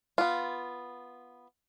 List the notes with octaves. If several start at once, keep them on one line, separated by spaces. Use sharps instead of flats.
B3 F4